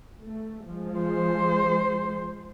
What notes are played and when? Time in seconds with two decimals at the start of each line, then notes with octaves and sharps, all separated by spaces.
0.23 A3
0.65 F3 G#3
1.00 C5